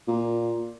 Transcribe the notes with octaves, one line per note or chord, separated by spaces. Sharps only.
A#2